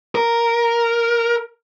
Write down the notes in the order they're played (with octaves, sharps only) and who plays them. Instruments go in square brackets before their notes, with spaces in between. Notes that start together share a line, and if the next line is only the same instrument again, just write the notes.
[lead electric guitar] A#4